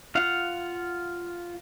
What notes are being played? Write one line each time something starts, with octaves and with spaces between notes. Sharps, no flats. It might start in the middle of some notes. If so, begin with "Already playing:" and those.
F4 F5 F#5